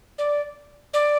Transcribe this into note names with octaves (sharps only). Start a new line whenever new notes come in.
D5
D5